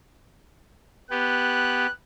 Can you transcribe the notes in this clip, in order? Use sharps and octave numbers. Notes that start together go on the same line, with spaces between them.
B3 G4 F#6